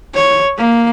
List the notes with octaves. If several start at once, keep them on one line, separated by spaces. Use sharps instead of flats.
C#5
A#3